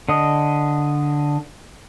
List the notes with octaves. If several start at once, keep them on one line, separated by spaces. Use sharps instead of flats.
D3 D#5